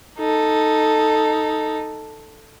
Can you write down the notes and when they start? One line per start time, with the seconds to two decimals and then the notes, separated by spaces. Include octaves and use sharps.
0.19 D#4 A4